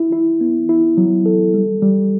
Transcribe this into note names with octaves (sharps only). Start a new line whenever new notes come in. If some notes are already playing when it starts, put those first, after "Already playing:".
Already playing: E4
E4
B3
E4
F#3
A4
G3
G3